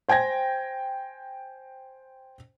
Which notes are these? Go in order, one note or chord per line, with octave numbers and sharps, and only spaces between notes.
C5 G5 G#5 G#6 A#6